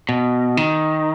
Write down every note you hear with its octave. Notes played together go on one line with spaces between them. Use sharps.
B2
D#3